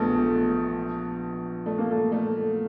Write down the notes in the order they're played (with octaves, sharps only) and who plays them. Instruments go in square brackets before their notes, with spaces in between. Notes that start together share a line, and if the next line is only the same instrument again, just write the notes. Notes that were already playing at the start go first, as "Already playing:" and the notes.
Already playing: [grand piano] A#1 [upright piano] A3 B3
[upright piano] A3
A#3
A3
A3